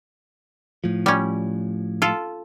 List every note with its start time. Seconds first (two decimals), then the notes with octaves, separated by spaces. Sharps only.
0.84 A2 F3
1.06 G3 C#4
2.02 F4 A4